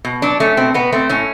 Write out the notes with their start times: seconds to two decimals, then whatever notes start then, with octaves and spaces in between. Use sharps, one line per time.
0.05 B2
0.22 F#3 D4
0.40 A3 C#4
0.57 B2 C4
0.74 B2 B3
0.92 A3 C4
1.09 A2 C#4